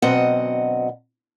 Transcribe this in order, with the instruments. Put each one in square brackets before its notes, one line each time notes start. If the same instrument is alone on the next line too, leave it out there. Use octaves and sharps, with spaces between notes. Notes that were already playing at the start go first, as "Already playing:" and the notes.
[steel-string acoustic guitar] D2 B2 F#3 C4 D#5 F#5